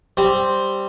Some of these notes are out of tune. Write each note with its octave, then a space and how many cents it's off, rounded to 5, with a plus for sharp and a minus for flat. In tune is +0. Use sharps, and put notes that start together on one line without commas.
G3 +0 C4 +0